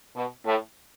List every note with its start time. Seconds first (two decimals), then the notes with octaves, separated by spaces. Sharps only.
0.15 B2
0.45 A2